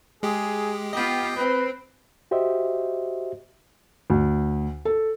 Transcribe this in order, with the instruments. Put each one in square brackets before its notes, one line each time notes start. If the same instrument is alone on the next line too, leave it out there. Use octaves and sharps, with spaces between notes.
[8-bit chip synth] G#3 G4 [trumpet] G#4
[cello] B3 F4 [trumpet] G4 [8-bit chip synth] D#5 G5
[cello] C4 [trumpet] B4
[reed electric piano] F#4 G4 C5 D#5 E5
[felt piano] D2
A4